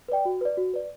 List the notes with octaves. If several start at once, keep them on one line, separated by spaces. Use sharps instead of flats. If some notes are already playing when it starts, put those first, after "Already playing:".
B4 D5 G5
F#4
B4 D5
F#4
B4 D5